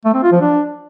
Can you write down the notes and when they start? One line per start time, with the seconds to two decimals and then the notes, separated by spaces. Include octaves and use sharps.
0.05 A3
0.14 C4
0.23 F4
0.32 F3
0.41 D4